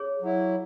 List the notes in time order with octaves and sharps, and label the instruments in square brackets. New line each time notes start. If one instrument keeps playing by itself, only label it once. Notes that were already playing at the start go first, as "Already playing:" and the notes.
Already playing: [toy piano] G#4 C#5
[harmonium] F#3 E4